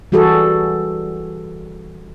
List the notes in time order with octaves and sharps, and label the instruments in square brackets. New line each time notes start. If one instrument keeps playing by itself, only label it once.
[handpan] E3 G3 F#4 G#4 A4